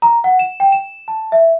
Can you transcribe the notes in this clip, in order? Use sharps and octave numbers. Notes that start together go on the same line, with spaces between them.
A#5
F#5
E7
G5
E7
A5
E5